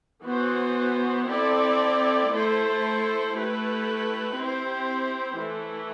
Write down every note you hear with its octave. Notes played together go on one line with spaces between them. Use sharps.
E3 B3 F#4 C5
C4 E4 A4 D5
A3 E4 A4 C5
A3 E4 G4 B4
C4 E4 G4 C5
E3 A3 E4